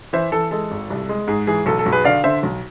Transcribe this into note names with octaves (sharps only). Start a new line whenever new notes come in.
E3 C5 E5
E3 A4
G#3 A4
G#1
C2
G#3
G#2 G#4
E3 G#4
B1 A4
A4
B1
G#4 B4
D3 D5 F5
D3 C5 E5
B1